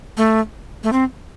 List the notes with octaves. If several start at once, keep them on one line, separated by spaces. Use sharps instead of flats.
A3
A3
C4